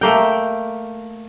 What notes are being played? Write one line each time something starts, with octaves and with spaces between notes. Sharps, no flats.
A3 A#3 G5